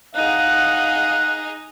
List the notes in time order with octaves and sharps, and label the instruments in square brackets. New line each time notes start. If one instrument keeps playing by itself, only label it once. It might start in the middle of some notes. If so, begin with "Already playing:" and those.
[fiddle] D#4 G#4 [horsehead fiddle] F5 F#5 [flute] F#6